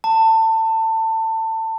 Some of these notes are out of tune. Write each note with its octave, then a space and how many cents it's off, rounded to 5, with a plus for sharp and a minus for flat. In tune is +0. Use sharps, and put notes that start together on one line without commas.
A5 +25